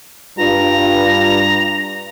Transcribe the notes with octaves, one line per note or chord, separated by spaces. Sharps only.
G2 F4 A#5